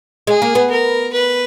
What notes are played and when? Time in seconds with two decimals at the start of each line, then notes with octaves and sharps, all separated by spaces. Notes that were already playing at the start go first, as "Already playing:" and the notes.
0.27 G#3 G#4
0.42 A#3
0.55 B3
0.70 A#4
1.13 B4